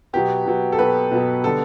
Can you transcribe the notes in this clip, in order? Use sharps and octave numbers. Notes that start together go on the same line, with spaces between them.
B2 F#3 B3 G4
B2 F#3 B3
A4
B2 F#3 B3 B4
B2 F#3 B3
D3 G3 B3 A4